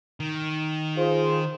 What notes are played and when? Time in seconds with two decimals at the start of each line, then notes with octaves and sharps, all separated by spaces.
0.20 D#3
0.97 F4 G#4 C5